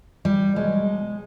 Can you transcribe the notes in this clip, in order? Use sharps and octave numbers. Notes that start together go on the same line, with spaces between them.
G3
B2 F#3 G#3